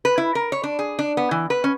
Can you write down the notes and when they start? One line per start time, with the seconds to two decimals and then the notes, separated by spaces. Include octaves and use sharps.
0.05 B4
0.18 E4
0.35 A#4
0.52 C#5
0.63 D4
0.79 G#4
0.99 D4
1.17 B3
1.31 E3
1.50 B4
1.64 C#4